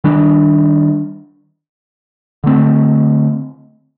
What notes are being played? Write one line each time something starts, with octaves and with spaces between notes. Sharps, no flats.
D#3 G3 D4
D3 A3 C4